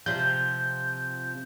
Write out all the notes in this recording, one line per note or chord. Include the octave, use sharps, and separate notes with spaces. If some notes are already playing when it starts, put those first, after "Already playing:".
C3 F3 G6